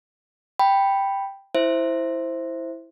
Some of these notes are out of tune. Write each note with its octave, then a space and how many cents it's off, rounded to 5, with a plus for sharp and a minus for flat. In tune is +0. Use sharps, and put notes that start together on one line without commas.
G5 +0 B5 +0
E4 +0 C5 +0 E5 +0